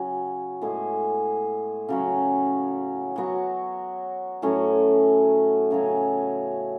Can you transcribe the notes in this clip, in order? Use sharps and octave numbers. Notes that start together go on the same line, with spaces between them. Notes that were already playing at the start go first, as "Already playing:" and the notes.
Already playing: C#3 F#3 C#4
A2 G#3 B3 E4
C#3 F#3 C#4
F#3 B3 F#4
A2 F#3 A3 C#4
C#3 F#3 C#4